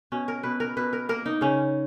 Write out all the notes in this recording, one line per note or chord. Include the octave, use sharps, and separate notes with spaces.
B2 C#4
A#4
B2 B4
A#4
B2 B4
A#4
A#3 A#4
D#4
C#3 C#4